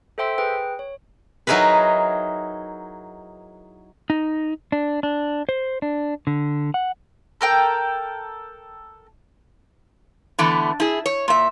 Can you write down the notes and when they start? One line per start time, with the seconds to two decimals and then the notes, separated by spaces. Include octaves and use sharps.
0.18 A4 C5 E5 G5 C6 E6
0.38 G#4 B4 G5
0.79 C#5
1.47 F#3 D#4 E4 G#4 A#4 B4
4.10 D#4
4.72 D4
5.03 D4
5.49 C5
5.82 D4
6.27 D3
6.74 F#5
7.41 A4 A#4 G5
10.39 D3 E3 A3 B3
10.80 E4 G#4
11.06 C#5
11.28 A#2 E5